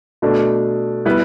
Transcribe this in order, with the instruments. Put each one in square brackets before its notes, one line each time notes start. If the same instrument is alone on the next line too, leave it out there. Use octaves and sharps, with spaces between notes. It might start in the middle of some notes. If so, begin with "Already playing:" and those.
[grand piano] B2 A3 D4
G3 B3 E4 B4